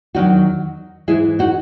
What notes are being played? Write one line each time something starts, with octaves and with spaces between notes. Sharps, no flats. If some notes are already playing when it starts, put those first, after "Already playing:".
E2 D#3 F#3 D#4 F#4
G#2 E3 G#3 E4 G#4
D#4 F#4